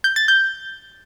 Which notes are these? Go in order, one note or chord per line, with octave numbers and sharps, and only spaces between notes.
G6
A6
G6